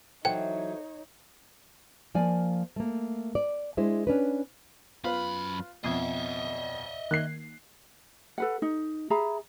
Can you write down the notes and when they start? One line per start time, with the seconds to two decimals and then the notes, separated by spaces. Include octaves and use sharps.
0.25 E3 F#3 D#4 A4 C5 C#5 F#5 G5
2.15 F3 A#3 D5 G#5
2.76 A3 A#3
3.35 D5
3.77 G#3 D4 E4 C5
4.07 C#4 D4 B4
5.04 F#2 B3 F4 B4 B5
5.84 F2 B2 D#5 E5 G#6 C7
7.11 D#3 A#3 F#6 G#6 C7
8.38 A4 B4 F#5
8.62 D#4
9.10 G#4 E5 A#5 B5